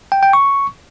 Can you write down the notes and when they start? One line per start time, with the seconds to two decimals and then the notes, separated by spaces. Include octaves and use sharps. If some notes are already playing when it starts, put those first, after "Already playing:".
0.12 G5
0.23 G5
0.33 C#6